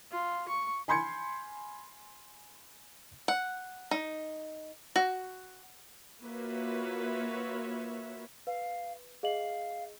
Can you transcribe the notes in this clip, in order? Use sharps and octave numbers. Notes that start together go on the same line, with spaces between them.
F4
C#6
G#5 B5 C6 G6 G#6 C#7
F#5
D#4
F#4
A#3 F4 F#4 B4 C#5 E5
B4 F5
G#4 D#5 F5 F#7